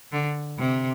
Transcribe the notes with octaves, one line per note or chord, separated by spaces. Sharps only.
D3
C3